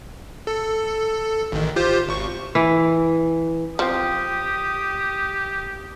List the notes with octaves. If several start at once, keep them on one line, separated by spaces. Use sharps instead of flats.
A4
A1 D#3
F4 G4 C5
G#1 C#6
E3
F3 C4 G4 D#6